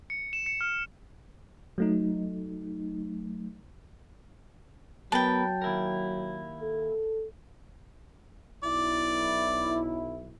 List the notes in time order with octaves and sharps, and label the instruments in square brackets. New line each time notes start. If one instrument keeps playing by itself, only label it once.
[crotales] C#7
E7
C#7
F6
[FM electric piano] F#3 A3 D#4
[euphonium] F#3 [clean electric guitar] B3 A#4 B4 [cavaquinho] G5 A5
[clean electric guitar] D#2 E4 A#4
[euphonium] A4
[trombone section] B1 E4 [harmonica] D5